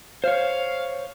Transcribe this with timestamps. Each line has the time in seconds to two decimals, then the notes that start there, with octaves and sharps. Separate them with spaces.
0.24 C5 C#5 F5